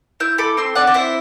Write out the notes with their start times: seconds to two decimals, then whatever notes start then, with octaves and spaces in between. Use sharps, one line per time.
0.20 E4 E6 G6
0.38 A4 B5 D6
0.57 C4 C6 E6
0.75 C4 D5 F#5
0.87 D5
0.94 E4 C5 E5